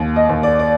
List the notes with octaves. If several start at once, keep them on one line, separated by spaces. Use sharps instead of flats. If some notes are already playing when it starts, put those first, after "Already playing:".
Already playing: D#2
D#5
D#2
D5
D5